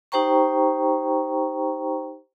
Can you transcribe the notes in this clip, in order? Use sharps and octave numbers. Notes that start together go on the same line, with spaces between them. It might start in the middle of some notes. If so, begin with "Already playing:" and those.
D#4 G4 C5 G5 A#5 C#6